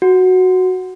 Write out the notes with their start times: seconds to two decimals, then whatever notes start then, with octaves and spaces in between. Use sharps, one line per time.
0.02 F#4